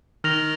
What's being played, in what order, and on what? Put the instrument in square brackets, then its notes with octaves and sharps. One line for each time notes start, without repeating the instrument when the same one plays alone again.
[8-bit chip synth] D#3 [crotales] F6 A#6 F7